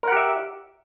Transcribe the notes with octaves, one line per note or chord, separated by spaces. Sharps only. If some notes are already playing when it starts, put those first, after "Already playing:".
G4 A#4 E5 F#5